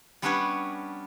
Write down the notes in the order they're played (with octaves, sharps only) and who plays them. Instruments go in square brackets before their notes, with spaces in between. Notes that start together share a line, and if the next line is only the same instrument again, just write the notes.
[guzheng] G3 B3 C#4 D4 B4 C#5